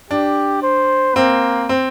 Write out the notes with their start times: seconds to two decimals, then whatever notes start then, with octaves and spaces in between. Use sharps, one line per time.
0.11 D4 G4
0.63 C5
1.16 A#3 C4
1.69 C4